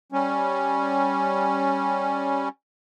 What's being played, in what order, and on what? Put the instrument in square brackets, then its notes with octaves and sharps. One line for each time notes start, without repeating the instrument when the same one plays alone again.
[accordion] G3 C#4